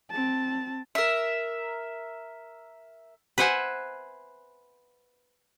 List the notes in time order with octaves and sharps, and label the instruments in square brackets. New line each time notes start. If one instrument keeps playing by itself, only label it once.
[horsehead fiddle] C4 A5
[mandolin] A#4 E5
[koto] B4 C5 E5 F#5 G#5